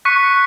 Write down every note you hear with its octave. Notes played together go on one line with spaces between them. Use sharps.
C#6 F#6 B6 C#7